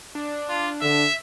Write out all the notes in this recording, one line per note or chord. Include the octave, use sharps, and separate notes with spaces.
D4
F4
D3 E5